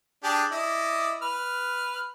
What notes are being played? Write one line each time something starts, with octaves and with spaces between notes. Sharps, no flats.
D4 G4 G#4
E4 D5 D#5
B4 F6